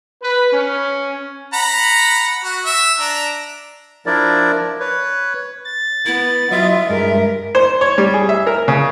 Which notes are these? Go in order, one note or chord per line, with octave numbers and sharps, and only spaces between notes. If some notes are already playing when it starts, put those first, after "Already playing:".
B4
C#4
F#5 A#5 B5
F#4
E5
D4 A#5
F3 D4 E4 A#4 D5
B4 C#5
A6
B3 E4
F#3 E4 F4 D#5 E5
G2 G#3 A#4
C5
C#5
G3
G#4
E5
A#4
C#3